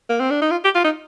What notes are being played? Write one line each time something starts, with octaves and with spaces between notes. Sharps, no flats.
A#3
C4
D4
D#4
F4
G4
F4
D#4